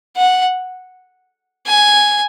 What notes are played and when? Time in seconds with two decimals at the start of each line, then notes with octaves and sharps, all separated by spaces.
0.16 F#5
1.67 G#5